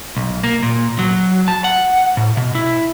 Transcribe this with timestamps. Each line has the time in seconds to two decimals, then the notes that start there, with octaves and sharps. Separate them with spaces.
0.17 B1
0.44 A#3
0.63 A#2
0.99 F#3
1.48 A5
1.64 F#5
2.17 A2
2.37 B2
2.55 E4